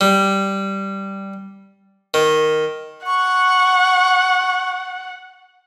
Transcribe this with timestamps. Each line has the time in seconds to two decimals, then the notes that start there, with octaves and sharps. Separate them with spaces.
0.01 G3
2.14 D#3
3.06 F#5 C#6